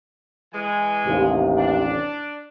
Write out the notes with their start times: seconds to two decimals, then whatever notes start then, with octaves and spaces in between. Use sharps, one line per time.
0.53 E3 G#3 G#5
1.06 A1 D#2 C3
1.58 D4